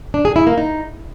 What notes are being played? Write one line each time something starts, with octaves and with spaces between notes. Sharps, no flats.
D4
G#4
E4
A#3
D#4